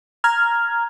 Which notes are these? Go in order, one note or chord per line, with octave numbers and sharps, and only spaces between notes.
A#5 F6 G#6